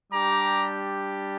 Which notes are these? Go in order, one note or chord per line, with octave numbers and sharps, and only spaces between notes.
G3 D4 G4 A#5 D6